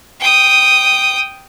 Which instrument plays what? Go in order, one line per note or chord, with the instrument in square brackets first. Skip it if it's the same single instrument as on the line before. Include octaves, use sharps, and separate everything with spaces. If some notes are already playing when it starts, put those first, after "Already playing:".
[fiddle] G5 D#6